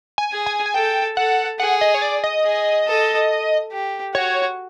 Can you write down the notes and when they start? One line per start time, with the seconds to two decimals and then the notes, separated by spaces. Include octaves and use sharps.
0.18 G#5
0.32 G#4
0.46 G#5
0.66 G#5
0.74 A4 G5
1.17 A4 F#5
1.60 G#4 F#5
1.81 D#5
1.94 C#5
2.02 D5
2.24 D#5
2.45 G#4
2.87 A4
3.72 G4
4.15 F#4 C#5